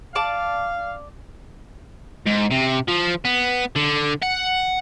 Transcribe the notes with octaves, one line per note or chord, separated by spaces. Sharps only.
D5 F5 A5 D6
G#2
C3
F3
B3
D3
F#5